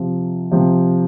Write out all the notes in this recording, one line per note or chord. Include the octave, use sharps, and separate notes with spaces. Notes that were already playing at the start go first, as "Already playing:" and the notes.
Already playing: C3 F3
C3 F3